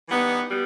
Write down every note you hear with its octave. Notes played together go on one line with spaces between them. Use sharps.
E3 G3 B3 D#4
G3 B3